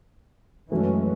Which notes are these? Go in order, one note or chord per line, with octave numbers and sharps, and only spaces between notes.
F#2 E3 F#3 G#3 A3 C#4